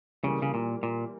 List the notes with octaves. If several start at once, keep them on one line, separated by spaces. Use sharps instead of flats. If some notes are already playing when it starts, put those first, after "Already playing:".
C#3 E3 G3 A#3
C#3
A#2
A#2